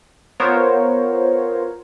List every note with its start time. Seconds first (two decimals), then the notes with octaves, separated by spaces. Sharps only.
0.40 B3 F4 A#4 C5 C#5